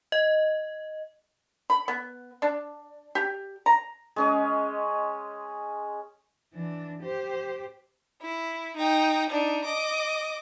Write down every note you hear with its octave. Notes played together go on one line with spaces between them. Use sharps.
D#5
B5
B3
D4
G4
A#5
G#3 C#4 D#5
E3 D4
G4 C5
E4
D#4 G5
D4 D#4
D#5 D6